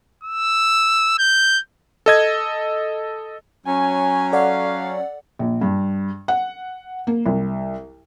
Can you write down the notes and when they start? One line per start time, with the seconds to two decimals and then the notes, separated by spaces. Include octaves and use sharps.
0.23 E6
1.19 G6
2.06 A4 D#5 G#6
3.66 F#3 C#4 G#5
4.33 A4 D5 F5 F#5
5.39 A#1
5.61 G2
6.28 F#5
7.07 A#3
7.26 C2